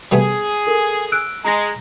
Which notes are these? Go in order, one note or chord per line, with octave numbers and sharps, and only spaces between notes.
G3 A3 B3 G#4
A4 A#4
E6 F#6 D7
G#3 A#5 A#6